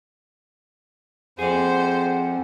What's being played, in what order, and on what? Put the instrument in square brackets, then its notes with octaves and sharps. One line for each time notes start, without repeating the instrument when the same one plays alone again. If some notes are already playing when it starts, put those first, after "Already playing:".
[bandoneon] F2 [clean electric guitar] G#4 D5 [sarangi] C5 [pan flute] F#5